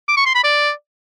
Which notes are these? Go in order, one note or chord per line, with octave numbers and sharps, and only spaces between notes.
D6
C#6
C6
B5
D5